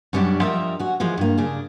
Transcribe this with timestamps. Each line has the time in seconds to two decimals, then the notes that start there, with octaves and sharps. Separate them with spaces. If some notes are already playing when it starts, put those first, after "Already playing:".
0.13 F#2 B2 G3 C#4 D4 D5
0.41 F3 G3 A#4 D#5 E5
0.79 C#4 F#4
1.00 E3 F3 G#3
1.18 G2 A#3
1.37 C#3 D4 G#4